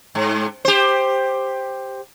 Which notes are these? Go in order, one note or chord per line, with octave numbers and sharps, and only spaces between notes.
G#2
G4 C5